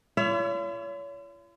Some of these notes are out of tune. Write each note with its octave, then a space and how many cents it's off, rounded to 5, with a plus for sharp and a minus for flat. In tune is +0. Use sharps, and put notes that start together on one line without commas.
F4 -45 C#5 +35 E5 +30